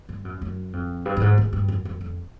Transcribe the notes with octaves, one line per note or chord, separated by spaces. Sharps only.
G2
F#2
F#2
F2
G2
G2
G#2
G#2
G2
F#2
F#2
F2